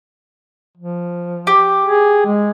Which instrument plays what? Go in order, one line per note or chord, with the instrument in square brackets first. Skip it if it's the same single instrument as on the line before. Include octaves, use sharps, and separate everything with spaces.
[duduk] F3
[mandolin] G4
[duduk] G#4
G#3